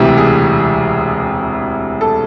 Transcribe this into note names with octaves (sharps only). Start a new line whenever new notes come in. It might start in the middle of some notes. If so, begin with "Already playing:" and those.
Already playing: E1 D2 C3 E3 G4
G#4
A4